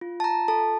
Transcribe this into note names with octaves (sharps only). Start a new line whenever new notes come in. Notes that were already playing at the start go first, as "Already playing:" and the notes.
F4
A5
A#5
A4 A5